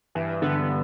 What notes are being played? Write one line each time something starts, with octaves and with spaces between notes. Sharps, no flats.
G2 E3
D3 B3